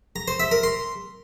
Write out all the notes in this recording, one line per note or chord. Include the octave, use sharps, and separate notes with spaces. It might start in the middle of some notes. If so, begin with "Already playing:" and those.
A#5
C5
E5
A#4
C6